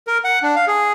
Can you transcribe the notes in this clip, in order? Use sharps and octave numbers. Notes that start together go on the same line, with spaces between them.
A#4
F#5
D4
F5
G#4